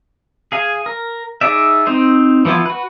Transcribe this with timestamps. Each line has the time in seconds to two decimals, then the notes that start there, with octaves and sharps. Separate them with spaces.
0.52 G#4 F5 G#5
0.86 A#4
1.41 D#4 G#4 D5 E5
1.87 C4 D#4 C5
2.45 E3 F3 B3 E4 F4
2.65 F#4 B4